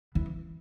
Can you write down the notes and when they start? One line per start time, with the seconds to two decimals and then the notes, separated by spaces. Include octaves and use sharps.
0.15 E3